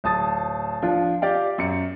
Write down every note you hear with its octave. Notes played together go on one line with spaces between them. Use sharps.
D1 A5 D#6 A6
F3 D4 F4
G4 D5 F5 G5
F#2 C#7